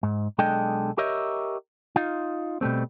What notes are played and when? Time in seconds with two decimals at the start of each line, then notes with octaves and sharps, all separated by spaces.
0.03 G#2
0.38 B1 G#3 D4 A4 D#5 G5
0.98 G4 A#4 C#5 D#5 E5
1.96 D#4 F4
2.61 B2 G3 A3 C4